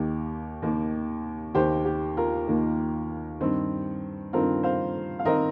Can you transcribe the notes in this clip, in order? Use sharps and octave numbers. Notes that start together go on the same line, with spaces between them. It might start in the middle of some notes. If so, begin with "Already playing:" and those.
Already playing: D#2 D#3 A#3 G4
D#2 D#3 A#3
D#2 D#3 A#3 G4 C5
G4
F4 A#4
D#2 D#3 A#3
G2 D#3 C4
G2 D#3 C4 F4 A#4
C5 F5
F5
D#3 C4 A#4 D#5